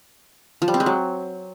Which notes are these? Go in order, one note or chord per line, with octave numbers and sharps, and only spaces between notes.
F3
G3
C4
G#3
F#3